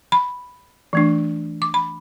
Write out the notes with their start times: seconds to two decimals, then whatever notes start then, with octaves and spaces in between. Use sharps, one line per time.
0.12 B5
0.93 E3 A3 D4
1.62 D6
1.74 B5